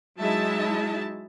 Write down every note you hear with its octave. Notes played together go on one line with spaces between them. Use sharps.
F#3 G#3 D#4 E4 E5 A5